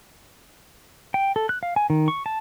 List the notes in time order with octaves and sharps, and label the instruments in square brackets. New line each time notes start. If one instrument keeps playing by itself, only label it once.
[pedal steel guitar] G5
A4
F#6
F5
G#5
D#3
C#6
A5